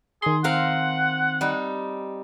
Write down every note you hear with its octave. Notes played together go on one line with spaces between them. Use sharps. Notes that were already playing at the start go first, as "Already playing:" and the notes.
D#3 G#4 C6
C4 F5 F#5 A#5
G3 D#4